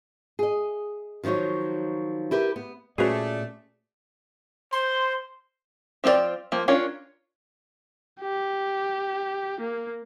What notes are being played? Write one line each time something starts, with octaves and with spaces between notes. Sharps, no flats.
G#4 D#5
D#3 F3 F#3 D#4 C#5
E4 G4 A#4 B4
B3
A#2 A3 C#4 F#4 G#4 B4 D5
C5 C6
F3 C4 F4 G#4 D5
F3 A#3
C#4 D4 F4 A#4 C#5
G4
A#3